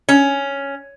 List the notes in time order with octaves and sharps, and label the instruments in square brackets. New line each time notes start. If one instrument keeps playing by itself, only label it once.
[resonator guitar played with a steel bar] C#4